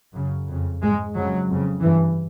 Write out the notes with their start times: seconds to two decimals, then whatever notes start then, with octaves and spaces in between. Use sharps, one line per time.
0.14 F#2 C#3
0.48 F2 C#3
0.81 G#2 G#3
1.15 F2 C#3 F#3
1.49 F2 C#3
1.83 G2 E3